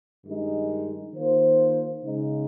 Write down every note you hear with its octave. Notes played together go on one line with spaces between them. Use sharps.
G2 D#3 G#3 D#4
D#3 A#3 F4 C5
C#3 G#3 D#4